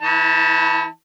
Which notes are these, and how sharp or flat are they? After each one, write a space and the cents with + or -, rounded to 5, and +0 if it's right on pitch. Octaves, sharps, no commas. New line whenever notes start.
E3 +0 E4 -45 A5 +15